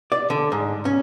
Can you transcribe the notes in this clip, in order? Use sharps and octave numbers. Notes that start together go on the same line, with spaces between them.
D5
D3
G#2
C#4